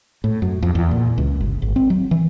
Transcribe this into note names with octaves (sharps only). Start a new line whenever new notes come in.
A2
F#2
F2
E2
A#2
C#2
G1
G#1
C4
F#3
E3